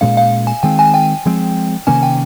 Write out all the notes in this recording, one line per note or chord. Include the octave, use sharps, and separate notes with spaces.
A#2 G#3 C#4 F5
F5
G#5
D#3 G#3 C4 G5
G#5
G5
F3 G#3 C4
C3 D#3 A#3 C#4 G#5
G5